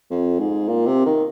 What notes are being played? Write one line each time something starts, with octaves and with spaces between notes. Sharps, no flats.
F2
G#2
A#2
C3
D#3